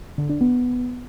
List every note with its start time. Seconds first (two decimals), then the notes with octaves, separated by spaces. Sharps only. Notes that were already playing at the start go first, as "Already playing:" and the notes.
0.18 D3
0.29 D4
0.41 B3